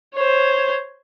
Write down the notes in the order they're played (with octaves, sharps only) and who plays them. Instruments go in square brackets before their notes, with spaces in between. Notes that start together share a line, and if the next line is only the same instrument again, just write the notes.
[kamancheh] C5 C#5